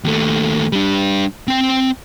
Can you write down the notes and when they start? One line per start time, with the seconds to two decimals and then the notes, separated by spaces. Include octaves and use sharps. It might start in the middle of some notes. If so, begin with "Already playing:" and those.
0.04 D#2 A3
0.72 G3 D4
1.48 C4 G5